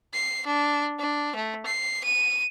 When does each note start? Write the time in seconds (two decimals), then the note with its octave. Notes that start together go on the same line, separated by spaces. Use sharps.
0.13 C7
0.46 D4
0.99 D4
1.36 A3
1.66 C7
2.04 D#7